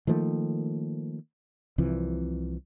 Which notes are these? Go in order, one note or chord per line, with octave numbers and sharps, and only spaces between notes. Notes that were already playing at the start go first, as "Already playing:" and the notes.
D#3 F3 A3 A#3
C2 C3 E3 F3